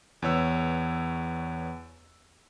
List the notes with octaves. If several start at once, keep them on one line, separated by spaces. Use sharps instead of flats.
E2 B3 C#5 E6